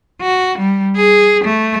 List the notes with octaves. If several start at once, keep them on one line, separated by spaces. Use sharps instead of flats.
F#4
G3
G#4
A3